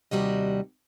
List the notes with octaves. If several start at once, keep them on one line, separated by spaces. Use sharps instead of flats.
D#2 C3 G3 F#4 D#5